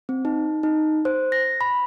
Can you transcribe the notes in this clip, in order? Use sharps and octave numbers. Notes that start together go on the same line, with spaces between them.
C4
D#4
D#4
C5
A#6
B5